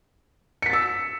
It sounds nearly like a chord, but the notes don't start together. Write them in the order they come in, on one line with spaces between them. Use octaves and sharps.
C#7 B6 A6 E6